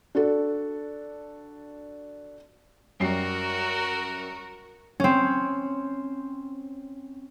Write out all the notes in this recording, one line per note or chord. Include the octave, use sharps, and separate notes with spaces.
D4 F#4 A4
F#2 G3 F#4 A#4 C7
C4 C#4